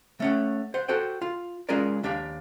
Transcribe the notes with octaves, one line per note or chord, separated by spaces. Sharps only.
A3 C#4 F#5
C5 F#5
F#4 A4 C5 G5
F4
G#3 C#4 F4 G#4 A#4 D5
D#2 D4 G4 F5